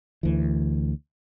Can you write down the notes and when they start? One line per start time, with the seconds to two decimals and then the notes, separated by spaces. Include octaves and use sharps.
0.23 D2 E3